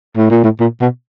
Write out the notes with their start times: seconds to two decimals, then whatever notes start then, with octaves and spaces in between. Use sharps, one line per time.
0.17 A2
0.31 A#2
0.44 A2
0.60 A#2
0.81 B2